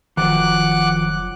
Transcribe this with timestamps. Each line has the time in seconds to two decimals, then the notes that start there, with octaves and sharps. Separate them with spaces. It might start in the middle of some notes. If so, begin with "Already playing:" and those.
0.17 F1 D#3 F3 F#3 F#5 D6 F#6